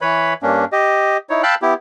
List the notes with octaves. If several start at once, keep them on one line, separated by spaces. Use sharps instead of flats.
E3 B4 C#5 B5
G2 A#3 C#4 D4
G4 D#5
D#4 E4 C#5
F5 G5 A5 B5 E6 F#6
B3 E4 G4